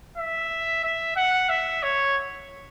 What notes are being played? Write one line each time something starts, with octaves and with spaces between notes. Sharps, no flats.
E5
E5
F#5
E5
C#5